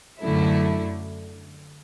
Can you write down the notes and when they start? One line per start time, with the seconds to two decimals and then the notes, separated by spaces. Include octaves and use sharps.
0.22 F#2 D3 F#3 A3 E4